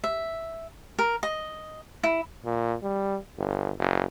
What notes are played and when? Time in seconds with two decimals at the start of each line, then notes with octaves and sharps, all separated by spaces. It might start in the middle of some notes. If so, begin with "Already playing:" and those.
0.04 E5
0.99 A#4
1.23 D#5
2.04 E4
2.45 A#2
2.83 G3
3.38 G1
3.78 F#1